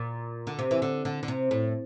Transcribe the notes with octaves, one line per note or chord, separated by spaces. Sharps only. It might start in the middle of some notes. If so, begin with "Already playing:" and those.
Already playing: A#2
D3
C3
E3
D3
D3
D3
C3
A2